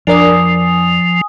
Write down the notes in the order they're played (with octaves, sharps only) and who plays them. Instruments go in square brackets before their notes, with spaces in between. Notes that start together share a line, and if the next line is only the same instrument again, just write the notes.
[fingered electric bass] F2 [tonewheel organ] F3 [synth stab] D4 A#4 D5 [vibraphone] G#5 D#6